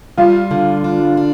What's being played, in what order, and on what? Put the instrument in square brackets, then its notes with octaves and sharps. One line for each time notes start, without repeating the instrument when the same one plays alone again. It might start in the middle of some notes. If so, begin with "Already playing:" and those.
[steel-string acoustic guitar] G3 [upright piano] F4
[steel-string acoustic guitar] D3
D4
D4